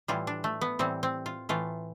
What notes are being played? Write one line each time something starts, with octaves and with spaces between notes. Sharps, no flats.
A2 E3 G3 F4
D4
A3
B3
A2 E3 G3 C4
C4
F4
A2 E3 A3 F4